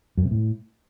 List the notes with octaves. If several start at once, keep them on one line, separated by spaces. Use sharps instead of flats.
F#2
C3
A2